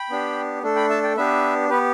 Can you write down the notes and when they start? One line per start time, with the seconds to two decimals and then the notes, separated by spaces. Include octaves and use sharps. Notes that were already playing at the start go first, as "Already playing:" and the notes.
Already playing: G5 B5
0.10 B3 D4 G4
0.63 A3 D4 A4
0.76 G5 B5
0.89 E5 A5
1.03 D5 G5
1.17 B3 D4 G4 B4 E5
1.69 B3 G4 B4